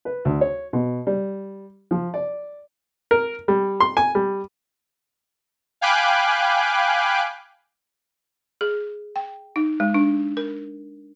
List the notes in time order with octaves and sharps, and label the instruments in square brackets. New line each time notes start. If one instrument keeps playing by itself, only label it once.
[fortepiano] B4
D2
C#5
B2
G3
F3
D5
A#4
G3
C6
G#5
G3
[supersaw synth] F5 G5 G#5 B5 D6 F#6
[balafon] G#4
G5
D#4
G#3
D4
A#4